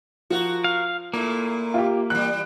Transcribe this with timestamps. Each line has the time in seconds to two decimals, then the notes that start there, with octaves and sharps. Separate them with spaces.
0.30 F3 F#4 A#4
0.64 F5
1.14 A#2 A3 A#3 E4
1.74 F4 G4
2.10 E3 G3 F#6